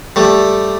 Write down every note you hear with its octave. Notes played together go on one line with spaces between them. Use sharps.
G3 A3